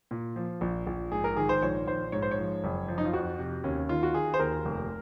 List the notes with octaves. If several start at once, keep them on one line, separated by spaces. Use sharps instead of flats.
A#2
F3
A#1
A#1
G#2 G#4
A#4
D#3 G#4
C5
A#1 C#5
A#1 C5
G#2 C#5
C5
C#5
F3
F#1
F3
D#4
F4
F2 F#4
C3
D#2 C#4
D#3 F4
F#4
D#3 G#4
C5
D#2 A#4
F1